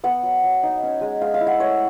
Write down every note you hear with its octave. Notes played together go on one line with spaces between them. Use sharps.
B3 F#5
F#3
F#3
D#4
C#4
G#3
G#3 F5
F5
E4
F#5
A3 C#5